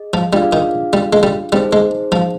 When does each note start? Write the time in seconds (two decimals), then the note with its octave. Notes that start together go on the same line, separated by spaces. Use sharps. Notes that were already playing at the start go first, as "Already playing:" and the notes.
Already playing: G#4 D#5
0.14 F3
0.33 G3 D4 F4 G#4 D5 F5
0.53 D#3
0.93 G3
1.13 G#3
1.23 G3
1.52 G3 C4 D#4 G#4 C5
1.73 G#3
2.12 F3